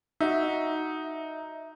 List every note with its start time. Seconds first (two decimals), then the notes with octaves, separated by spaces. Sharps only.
0.20 D#4 F#4 E5